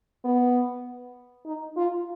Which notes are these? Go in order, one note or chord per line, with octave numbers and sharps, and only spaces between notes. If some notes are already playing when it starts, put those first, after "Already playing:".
B3
D#4
F4